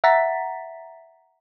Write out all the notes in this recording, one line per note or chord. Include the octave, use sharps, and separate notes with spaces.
E5 F#5 A#5 A6 B6